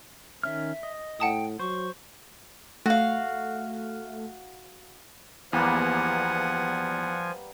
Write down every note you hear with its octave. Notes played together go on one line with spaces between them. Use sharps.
D#3 C#4 E5 F6
D#5
A2 F#5 G5 A5 D#6
F#3 C5 C#6
A3 F#4 F5
E2 F3 G3 A#3 B3 F#5 G#5